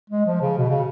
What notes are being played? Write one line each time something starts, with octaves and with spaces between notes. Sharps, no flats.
G#3
F3
C#3
B2
C#3